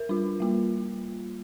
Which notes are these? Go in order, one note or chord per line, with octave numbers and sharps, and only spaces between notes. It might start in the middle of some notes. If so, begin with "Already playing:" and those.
Already playing: A#4
G3 D4 F4
G3 A#3 F4